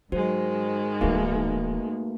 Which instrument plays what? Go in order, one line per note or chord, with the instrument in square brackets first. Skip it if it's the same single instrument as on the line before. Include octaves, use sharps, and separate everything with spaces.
[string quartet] G#2 D#3 G#3 [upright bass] F#3 [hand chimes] F#4 C5
[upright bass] D1 E3 [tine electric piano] A3 A#3 [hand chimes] D#4 F#4 B4